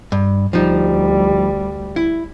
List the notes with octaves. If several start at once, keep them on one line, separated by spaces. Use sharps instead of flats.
G2
D2 F3 G3 D#4
E4